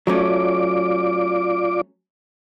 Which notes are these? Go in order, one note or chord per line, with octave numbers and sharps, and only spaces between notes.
F#3 A3 C#4 F4 D5 D6